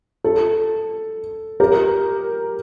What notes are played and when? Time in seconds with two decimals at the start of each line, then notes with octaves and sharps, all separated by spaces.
0.24 A4
1.60 G4 A#4